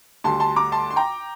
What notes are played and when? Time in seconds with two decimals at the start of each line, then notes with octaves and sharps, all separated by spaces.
0.24 D2 D3 G3 A5 C6
0.40 A5 C6
0.56 A#5 D6
0.72 A5 C6
0.90 C6
0.96 G5 A#5